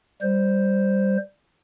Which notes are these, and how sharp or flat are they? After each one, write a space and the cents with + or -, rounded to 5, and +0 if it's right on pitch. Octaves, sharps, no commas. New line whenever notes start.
G3 +0 C5 +0